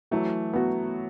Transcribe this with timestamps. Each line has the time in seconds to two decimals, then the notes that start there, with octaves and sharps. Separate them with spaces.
0.11 E3 F#3 A3
0.53 B3 F#4